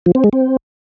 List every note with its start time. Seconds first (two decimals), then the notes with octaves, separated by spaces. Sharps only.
0.06 F3
0.15 C4
0.24 G#3
0.33 C4